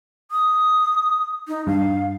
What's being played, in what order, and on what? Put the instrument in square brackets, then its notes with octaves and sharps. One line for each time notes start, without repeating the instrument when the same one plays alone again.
[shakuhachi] D#6
D#4
[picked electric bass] G2 [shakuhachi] F5